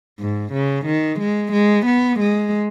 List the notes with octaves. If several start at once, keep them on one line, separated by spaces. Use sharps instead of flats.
G#2
C#3
D#3
G#3
G#3
B3
G#3